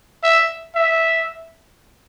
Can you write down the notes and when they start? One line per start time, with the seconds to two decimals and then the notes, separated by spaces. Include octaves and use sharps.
0.23 E5
0.75 E5